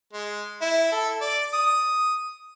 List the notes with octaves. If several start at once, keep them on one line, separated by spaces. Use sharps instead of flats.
G#3
E4
A4
D5
D#6